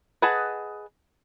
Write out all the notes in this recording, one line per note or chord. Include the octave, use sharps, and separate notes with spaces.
G#4 B4 D#5 F#5 A5